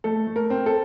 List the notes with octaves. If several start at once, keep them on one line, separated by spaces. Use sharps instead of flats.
A3 A4
A3
A#4
C4
A4